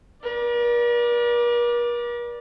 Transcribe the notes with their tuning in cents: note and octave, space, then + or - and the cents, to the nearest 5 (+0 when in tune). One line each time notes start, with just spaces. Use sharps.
A#4 +45 D5 +0